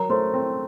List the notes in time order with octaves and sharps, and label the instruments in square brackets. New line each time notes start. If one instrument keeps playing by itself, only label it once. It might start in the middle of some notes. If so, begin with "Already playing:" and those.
Already playing: [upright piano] F#3 [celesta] A#4 A#5
[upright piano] A3 [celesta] C5 C6
[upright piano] C4